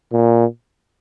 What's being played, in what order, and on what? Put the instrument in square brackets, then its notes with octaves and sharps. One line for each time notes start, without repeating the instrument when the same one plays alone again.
[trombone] A#2